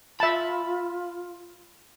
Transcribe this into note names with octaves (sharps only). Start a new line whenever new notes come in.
F4 E5 A5 B5